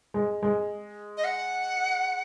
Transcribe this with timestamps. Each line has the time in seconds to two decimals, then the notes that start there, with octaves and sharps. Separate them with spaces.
0.14 G#3
0.43 G#3
1.17 D#5
1.25 F#5